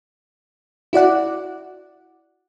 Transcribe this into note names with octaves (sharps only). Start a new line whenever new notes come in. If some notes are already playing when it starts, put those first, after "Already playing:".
E4 F#4 D5 F#5